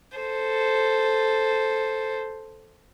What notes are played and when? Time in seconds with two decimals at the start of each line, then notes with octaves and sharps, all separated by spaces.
0.18 A4 C5